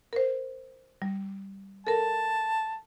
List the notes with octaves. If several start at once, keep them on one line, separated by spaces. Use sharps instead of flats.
A#4 C5
G3
A4 A#4 A5